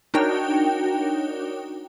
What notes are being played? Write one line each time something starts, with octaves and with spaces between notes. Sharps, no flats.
D4 D#4 F#4 A#4 C#5 G5